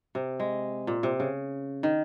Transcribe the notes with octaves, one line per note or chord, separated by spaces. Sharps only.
C3
G#3
A#2
C3
C#3
D#3